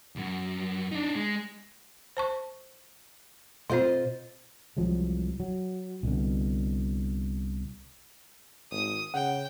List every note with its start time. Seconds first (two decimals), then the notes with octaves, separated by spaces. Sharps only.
0.16 C2 F#2
0.92 D4 D#4
1.16 G#3
2.17 C5 A5 C#6
3.70 B2 C4 F4 C5 D#5
4.77 C2 F3 F#3 G#3
5.40 F#3
6.03 C2 B2 D3
8.71 G#1 D#6
9.14 C#3 F#5 G5